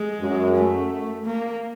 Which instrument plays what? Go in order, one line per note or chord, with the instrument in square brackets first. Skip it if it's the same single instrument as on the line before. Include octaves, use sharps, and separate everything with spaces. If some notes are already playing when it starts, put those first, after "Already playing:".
Already playing: [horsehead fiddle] G#3
[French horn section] F#2
[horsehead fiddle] A3
A#3